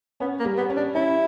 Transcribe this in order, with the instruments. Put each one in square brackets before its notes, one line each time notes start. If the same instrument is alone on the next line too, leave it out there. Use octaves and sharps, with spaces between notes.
[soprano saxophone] B3 [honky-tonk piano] C#4
[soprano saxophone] A#3
[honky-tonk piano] G3
[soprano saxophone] B3
[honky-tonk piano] C#4
[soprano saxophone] D4
[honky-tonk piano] C#4 [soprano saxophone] E4